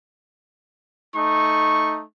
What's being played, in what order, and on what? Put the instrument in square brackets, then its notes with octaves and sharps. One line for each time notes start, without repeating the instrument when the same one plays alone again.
[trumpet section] A3 D#4 C#6